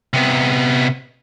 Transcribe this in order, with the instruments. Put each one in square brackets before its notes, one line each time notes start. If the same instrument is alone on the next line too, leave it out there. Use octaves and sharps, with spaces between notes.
[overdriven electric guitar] C3 B3